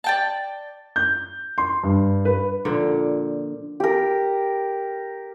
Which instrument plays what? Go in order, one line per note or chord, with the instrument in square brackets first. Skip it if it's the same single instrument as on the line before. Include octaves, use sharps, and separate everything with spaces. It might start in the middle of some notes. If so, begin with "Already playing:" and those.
[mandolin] D5 G5 A5
[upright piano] G6
C6
G2
B4
[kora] A#2 D3 F3
[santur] G4 A#4